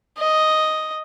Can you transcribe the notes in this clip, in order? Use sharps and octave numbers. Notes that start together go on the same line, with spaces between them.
D#5